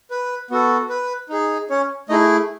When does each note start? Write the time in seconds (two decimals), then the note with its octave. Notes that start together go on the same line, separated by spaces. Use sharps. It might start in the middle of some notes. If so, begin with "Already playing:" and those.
0.11 B4
0.50 B3 F#4 A4
0.89 B4
1.29 D#4 G#4
1.70 C#4 C#5
2.09 A3 D#4 E4 G#4 D#5